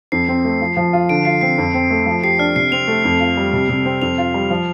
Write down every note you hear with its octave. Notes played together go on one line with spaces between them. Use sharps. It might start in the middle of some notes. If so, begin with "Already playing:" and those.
F2 C7
C4
A3
F3
F3
F4
D3 D7
F4 C7
C4 C7
F2
C4
A3
F3
G4 C7
D4 F6
C3 C7
C4 F7
A3
F2
F4
G3
C3
C3
C4
F2 F7
F4
G3
F3